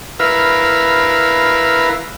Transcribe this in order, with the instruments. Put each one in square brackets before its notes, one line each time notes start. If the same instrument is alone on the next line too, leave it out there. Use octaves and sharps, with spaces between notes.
[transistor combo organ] E4 A#4 B4 F5